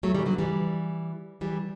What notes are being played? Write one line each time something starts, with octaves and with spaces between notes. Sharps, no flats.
F#3 A3
E3 G3
D3 F#3
E3 G3
E3 G3